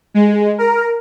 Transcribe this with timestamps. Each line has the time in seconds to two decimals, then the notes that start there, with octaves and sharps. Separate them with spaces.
0.14 G#3
0.58 A#4